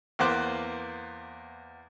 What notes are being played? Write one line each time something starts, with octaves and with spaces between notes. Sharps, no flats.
E2 A#3 B3 C5 D6 F#6